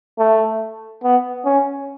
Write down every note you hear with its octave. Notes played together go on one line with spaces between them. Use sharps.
A3
B3
C#4